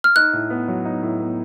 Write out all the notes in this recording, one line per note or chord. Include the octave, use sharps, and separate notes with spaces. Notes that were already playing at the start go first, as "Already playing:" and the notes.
F6
D#4 F#6
A2
B3
F#3
D#4
A2
B3